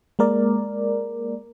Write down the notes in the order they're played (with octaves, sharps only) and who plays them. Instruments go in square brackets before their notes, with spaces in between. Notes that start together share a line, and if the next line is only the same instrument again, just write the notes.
[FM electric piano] G#3 A#3 A#4 D5